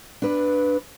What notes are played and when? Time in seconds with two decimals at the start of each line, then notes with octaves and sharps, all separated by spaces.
0.22 D4 B4